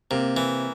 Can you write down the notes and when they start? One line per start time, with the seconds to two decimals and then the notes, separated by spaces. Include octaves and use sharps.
0.11 C3 A#3
0.37 E3